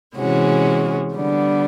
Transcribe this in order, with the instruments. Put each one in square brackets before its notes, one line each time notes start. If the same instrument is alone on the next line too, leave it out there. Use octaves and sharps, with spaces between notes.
[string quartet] C3 E3 G#3 C#4 F#4
D3 G3 B3 D4